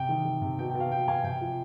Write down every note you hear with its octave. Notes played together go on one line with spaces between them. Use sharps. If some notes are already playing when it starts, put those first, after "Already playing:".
Already playing: C3 G5
D#3
D#3
C3
B2 G5
G5
B2
F5
B2 G5
B2 F5 G#5
C3 G5
F3